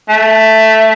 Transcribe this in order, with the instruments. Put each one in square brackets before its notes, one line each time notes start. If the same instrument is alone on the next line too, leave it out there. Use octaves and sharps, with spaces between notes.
[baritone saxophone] A3